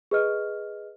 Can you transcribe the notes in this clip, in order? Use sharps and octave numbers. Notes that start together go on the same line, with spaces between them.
G#4 B4 D#5 F6